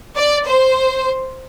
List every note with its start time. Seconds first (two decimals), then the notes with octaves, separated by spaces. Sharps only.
0.16 D5
0.46 C5